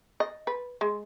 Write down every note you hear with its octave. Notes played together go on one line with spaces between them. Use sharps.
D#5
B4
G#3